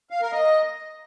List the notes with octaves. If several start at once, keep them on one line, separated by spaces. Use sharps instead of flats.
F5
A#4
D#5